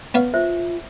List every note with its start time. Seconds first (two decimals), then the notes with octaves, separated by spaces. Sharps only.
0.14 B3 C#5 F5
0.34 F4 C5 E5